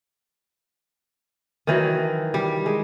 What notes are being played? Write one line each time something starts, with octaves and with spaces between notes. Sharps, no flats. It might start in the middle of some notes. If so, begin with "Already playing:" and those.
D#3 E3 F#3
G3
G#3